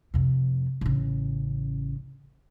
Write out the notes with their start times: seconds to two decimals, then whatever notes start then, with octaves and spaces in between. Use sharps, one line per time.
0.14 F2 C3
0.81 A1 C#3